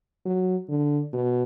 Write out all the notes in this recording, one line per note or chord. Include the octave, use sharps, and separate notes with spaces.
F#3
D3
B2